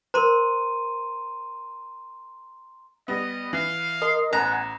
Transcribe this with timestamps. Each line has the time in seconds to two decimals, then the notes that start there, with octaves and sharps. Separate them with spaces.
0.14 A#4 C5 A#5 C6 D#7
3.08 G3 B3 D#5
3.53 E3 F5
4.02 A#4 D#5 C6
4.33 A1 B3 F#5 G#5 A#5